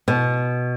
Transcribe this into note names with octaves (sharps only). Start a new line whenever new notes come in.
B2